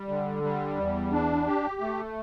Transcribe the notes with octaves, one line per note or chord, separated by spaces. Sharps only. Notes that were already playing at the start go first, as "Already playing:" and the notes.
Already playing: G3
D3
G3
E2
D4
G4
A3